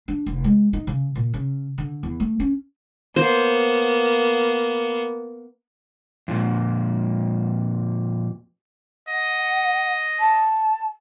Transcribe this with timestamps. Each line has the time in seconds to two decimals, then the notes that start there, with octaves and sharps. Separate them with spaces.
0.08 D4
0.26 F1
0.44 G#3
0.73 D#4
0.87 C#3
1.15 A#2
1.34 C#3
1.78 D3
2.03 E2
2.20 A3
2.40 C#4
3.16 A#3 B3 C5
6.28 F2 A#2
9.08 D#5 F#5
10.20 A5